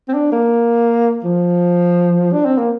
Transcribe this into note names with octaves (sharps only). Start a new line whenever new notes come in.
C4
D4
A#3
F3
D4
C4
A#3